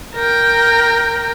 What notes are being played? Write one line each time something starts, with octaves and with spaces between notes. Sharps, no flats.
A#4 G5